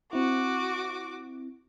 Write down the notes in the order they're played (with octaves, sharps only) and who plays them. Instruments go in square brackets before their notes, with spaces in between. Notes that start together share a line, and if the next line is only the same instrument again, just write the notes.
[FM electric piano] C4 E4 [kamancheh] F#4 D6